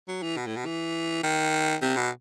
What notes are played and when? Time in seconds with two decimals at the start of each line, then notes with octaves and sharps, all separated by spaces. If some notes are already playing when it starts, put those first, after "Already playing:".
0.08 F#3
0.23 E3
0.37 B2
0.47 A2
0.57 B2
0.66 E3
1.24 D#3
1.82 C3
1.97 B2